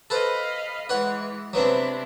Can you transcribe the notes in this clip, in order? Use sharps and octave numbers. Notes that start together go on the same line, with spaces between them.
A4 B4 C5 D#5 F5 B5
E3 G#3 B4 C#5 F#5
C3 F#3 B3 C4 D4 E4